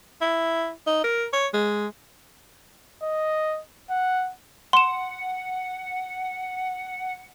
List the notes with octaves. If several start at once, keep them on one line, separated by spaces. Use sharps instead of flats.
E4
D#4
A#4
C#5
G#3
D#5
F#5
F#5 C6 E7